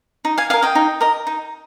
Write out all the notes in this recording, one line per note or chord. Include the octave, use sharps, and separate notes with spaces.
D#4
F5 G#5
A#4 D#5 F5 G#5
D#5 G5
D#4
A#4 D#5
D#4